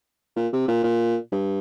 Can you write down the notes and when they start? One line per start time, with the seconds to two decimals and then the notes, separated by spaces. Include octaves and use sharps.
0.37 A#2
0.53 C3
0.68 A#2
0.84 A#2
1.32 G2